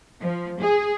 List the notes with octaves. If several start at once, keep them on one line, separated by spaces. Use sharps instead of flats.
F3
G#4